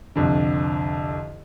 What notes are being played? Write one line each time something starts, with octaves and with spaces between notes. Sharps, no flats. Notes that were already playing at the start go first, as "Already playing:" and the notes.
C2 F2 D3